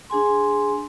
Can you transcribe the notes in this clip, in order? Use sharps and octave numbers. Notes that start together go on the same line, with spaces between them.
D4 G#4 G#5 C6